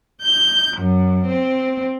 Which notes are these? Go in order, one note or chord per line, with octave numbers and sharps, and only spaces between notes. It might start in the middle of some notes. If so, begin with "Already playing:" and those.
G6
F#2
C4